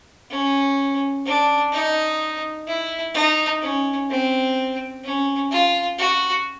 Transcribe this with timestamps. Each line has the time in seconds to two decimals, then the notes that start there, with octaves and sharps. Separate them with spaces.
0.30 C#4
1.26 D4
1.73 D#4
2.67 E4
3.15 D#4
3.62 C#4
4.10 C4
5.05 C#4
5.52 F4
5.99 F#4